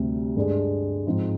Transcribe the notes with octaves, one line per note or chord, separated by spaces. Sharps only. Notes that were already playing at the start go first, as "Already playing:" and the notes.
Already playing: D2 C3 G3
G2 D3 G#3 D4
G#2 F3 C4 D#4